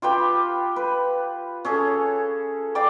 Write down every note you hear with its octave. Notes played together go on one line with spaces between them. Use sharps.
F4 G4 B4 G5
B4
C#4 G#4 A4
D5 F5 G5 D6